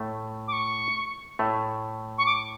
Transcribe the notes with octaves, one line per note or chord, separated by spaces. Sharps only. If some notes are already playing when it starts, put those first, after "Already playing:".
Already playing: A2 A3
D6
C#6
A2 A3
C#6
D6